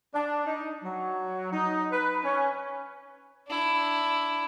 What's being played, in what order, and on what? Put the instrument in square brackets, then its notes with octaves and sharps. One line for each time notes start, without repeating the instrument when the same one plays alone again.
[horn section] D4
D#4
F#3
D#4
B4
C#4
[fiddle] D4 E4